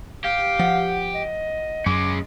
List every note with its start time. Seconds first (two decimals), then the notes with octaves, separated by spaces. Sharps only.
0.24 G4 F5
0.59 F3 F#5
1.15 D#5
1.86 F#2 G#3 C#4 D6